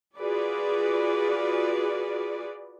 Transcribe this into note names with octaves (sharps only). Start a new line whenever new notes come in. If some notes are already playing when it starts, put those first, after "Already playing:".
F4 F#4 G#4 B4 D5